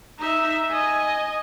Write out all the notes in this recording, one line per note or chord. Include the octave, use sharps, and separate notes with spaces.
D#4 E5
D#5 G#5